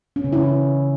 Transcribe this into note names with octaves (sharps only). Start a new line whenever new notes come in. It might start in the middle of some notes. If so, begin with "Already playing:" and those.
C#4
C#3
E4